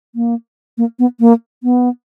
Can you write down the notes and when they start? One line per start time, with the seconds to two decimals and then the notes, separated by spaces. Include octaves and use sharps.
0.15 A#3
0.78 A#3
0.99 B3
1.20 A#3
1.63 B3